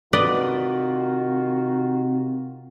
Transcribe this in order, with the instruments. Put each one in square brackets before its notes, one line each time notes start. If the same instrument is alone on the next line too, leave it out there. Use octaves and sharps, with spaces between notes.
[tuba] C3 [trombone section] D#3 F4 F#4 [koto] B4 D5 D#5